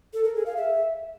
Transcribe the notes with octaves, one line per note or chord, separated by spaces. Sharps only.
A4
A#4
G#4
F5
E5